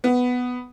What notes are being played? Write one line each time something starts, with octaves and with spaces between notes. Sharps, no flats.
B3